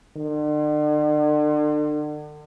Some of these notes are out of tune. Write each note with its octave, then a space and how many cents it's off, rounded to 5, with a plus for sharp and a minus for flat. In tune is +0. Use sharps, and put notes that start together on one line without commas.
D3 +40